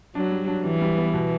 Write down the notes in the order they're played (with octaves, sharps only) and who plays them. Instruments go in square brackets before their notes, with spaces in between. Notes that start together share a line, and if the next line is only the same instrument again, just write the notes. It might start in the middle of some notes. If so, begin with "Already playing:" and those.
[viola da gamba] F#3 [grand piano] D4
[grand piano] G3
D4
[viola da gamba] E3 [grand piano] G3
[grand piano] G3
B3
B2